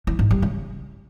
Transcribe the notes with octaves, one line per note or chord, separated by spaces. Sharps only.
E3
G#2
G3
C#3